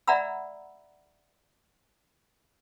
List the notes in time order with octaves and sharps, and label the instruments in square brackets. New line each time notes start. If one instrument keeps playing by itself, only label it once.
[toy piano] D5 E5 F#5 A#5 B5 E6